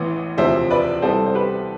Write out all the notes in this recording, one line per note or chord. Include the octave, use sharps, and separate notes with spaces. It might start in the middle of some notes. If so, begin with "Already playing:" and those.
Already playing: A1 A2 E3 B3
E1 D2 C3 F3 C5 E5
B4 D5
C2 C3 G3 B3 A4 C5
C5
G4 B4